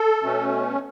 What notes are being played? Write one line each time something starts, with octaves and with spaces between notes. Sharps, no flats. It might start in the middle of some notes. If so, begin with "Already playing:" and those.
Already playing: A4
B2 A3 C#4